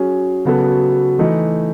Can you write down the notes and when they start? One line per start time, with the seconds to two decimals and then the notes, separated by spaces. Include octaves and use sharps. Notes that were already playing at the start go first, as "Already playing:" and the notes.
Already playing: F#3 C#4 G#4
0.45 C#3 F#3 B3 F#4 A4
1.19 E3 A3 D#4